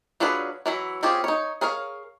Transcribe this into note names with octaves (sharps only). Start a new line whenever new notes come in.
F#3 D4 F4 G#4 B4
E3 F#3 E4
C4 C#4 F4 G4 G#4
D#4 C#5
G#4 A#4 C#5 F5